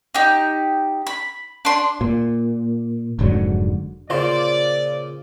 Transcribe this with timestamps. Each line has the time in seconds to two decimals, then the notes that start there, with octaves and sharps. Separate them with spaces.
0.15 D#4 G4
1.07 B5
1.65 D4 C6
2.01 A#2
3.19 F1 G#2 D3 F#3
4.10 A#2 C#3 F4 C5 D5